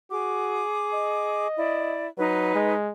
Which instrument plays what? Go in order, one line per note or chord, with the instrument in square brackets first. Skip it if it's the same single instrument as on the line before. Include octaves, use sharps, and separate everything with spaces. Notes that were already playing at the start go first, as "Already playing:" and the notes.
[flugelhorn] F#4 [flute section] G#4 D6
[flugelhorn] D#5
[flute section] E4 D5
[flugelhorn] F#3 [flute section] D#4 B4
[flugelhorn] G#3